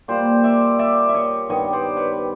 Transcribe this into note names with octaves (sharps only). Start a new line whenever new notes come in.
A#2 G3 A#3 C5 D5
D5 E5
D5 E5
E5
C#5 D#5
G2 D#3 G3 B3 C#5 D#5
C5 D5
B4 C#5